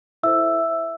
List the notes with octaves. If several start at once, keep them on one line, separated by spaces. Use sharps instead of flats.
E4 A4 C5 E5 E6